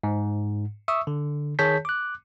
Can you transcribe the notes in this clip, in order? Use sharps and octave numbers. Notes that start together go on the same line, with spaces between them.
G#2
E5 C#6 D#6 E6
D3
D#3 G#4 C#5 A5 G6 B6
D6 F#6